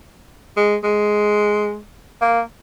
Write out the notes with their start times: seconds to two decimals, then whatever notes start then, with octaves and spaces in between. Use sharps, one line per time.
0.56 G#3
0.84 G#3
2.21 A#3